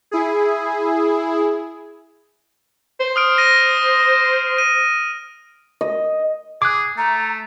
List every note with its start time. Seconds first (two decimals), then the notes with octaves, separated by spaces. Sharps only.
0.11 E4 G#4
3.00 C5
3.16 D#6 F6 D7
3.38 A#6 D#7
4.58 D#7
5.81 D#5
6.62 G#4 D6 F#6
6.97 A3 A#5